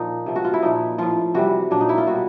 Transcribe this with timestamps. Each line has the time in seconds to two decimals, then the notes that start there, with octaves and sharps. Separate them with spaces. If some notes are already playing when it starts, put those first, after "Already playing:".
Already playing: A#2 F3 A#3 D#4
0.26 C3 F3
0.36 F#4
0.45 F4
0.54 E4
0.62 A#2 F3 D#4
0.98 A2 F3 F4
1.34 C3 E3 G3 F#4
1.71 A#2 F#3 D4
1.81 D#4
1.89 E4
1.98 F4
2.07 B2 G3 F#4